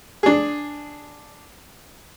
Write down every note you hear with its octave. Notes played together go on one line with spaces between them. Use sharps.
D4 G#4